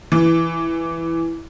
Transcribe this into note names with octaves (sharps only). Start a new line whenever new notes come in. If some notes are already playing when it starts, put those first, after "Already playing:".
E3